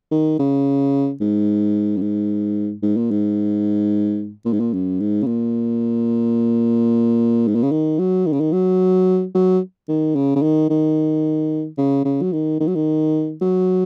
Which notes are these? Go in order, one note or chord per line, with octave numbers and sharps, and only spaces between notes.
D#3
C#3
G#2
F#2
G#2
G#2
A#2
G#2
A#2
G#2
A#2
F#2
G#2
C#3
A#2
G#2
A#2
C#3
D#3
F#3
D#3
C#3
D#3
F#3
F#3
D#3
C#3
C#3
D#3
D#3
C#3
C#3
F#3
D#3
D#3
F#3
D#3
F#3